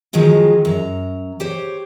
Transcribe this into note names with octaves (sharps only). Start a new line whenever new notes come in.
D#3 F3 F#3 G#3 F4
F#2 A#5
G4 C5 C#5